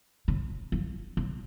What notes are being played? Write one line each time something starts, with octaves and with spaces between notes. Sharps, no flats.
C#3
F3
C#3